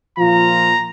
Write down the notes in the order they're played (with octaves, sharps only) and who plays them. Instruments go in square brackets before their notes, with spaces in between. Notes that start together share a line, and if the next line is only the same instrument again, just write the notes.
[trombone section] A#2 F3 F4 [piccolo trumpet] A#5